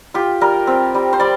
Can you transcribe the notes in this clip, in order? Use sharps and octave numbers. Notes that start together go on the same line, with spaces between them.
F4 G4
G3 A#4
C4
G3
C5
G3 D5